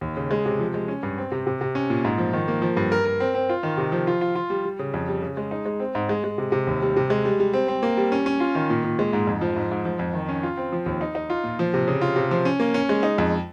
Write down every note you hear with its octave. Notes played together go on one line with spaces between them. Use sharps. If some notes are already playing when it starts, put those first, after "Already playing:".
D#2
C#3
G#3
C3
F3
G#3
C#4
G2
C4
C3
C3
C3
C#4
A#2
G#2
F3
D#3
A#3
F3
G2
A#4
A#4
C4
C4
F4
D#3
C3
F3
F4
F4
F4
G3
G3
C#3
F2
G3
C#3
G#3
D#4
G#3
C4
G#2
G#3
G#3
C3
C3
D#2
G3
C3
G#3
G3
G3
C4
C4
A#3
G3
C#4
C#4
F4
D#3
A#2
A#2
G#3
G#2
F2
F3
G#2
G#2
F3
F2
D#3
C#4
F4
C4
F3
D#2
D#4
D#4
F4
A#2
F3
C3
C#3
F4
C3
F3
C#4
A#3
C#4
G#3
D#4
F2